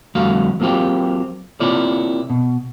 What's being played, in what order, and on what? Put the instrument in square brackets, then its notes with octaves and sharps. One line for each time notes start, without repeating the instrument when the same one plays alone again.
[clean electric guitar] F2 D3 G3 A3 F#4 F5
F#3 A#3 C4 F4 G4
C3 A#3 E4 F4 C#5 D5
B2